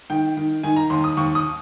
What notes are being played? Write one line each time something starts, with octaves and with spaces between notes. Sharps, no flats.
D#3 G5
D#3
D#3 G#5
A#5
D#2 C6
D#6
D#2 C#6
D#6